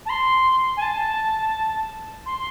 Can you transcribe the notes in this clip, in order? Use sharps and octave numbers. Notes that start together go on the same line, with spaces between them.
A5
C6
G#5
A5
C6